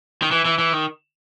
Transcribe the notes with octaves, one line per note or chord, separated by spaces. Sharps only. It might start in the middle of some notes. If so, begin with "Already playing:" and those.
D#3
E3
E3
E3
D#3